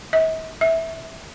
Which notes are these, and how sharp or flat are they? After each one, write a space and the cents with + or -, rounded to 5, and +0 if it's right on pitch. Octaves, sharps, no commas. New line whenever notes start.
E5 -45
E5 -10